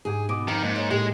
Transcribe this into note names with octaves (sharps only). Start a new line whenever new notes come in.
G#2 G4 G#4 G#5
B2 D6 D#6 D7
F2 D#3
G#2 A#3
C#5
A2 G#3 G4